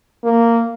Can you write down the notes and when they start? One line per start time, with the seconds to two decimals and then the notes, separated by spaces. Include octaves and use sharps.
0.24 A#3